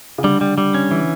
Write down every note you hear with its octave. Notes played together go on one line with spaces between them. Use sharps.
C#3
D3 G3
G3
G3
C#4
E3